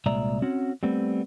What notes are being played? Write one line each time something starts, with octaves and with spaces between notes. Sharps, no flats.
C2 A#2 G#3 D5 E5 A#5
C4 C#4 F#4 F#5
G3 A3 B3 C4